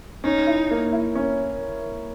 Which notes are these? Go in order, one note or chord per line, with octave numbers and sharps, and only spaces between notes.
C#4 D#4
E4
A#3
E4
C#4